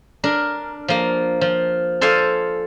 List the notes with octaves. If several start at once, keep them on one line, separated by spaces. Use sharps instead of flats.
D4 A#4
F3 A#3
F3
A4 C5 D5 F5 G#5